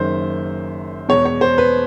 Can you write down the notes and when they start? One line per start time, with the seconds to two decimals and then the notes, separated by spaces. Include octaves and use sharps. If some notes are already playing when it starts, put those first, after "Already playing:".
Already playing: F#1 F#2 D#3 C5
1.09 E1 E2 B2 C#5
1.26 C#5
1.41 C5
1.58 B4